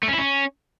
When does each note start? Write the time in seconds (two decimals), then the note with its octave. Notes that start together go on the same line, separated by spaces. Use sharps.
0.03 A3
0.08 C#4
0.13 E4
0.18 C#4